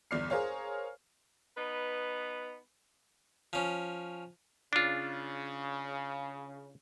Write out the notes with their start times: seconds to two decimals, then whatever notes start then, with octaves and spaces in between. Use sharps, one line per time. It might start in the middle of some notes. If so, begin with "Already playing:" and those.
0.11 G1 E2 D5 F6 C7
0.30 G#4 A#4 C5 C#5 F5
1.57 B3 D#4 B4
3.53 F3 C#4
4.73 C#3 D4 F4